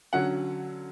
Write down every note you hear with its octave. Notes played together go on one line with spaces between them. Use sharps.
D3 F#3 C#4 F#5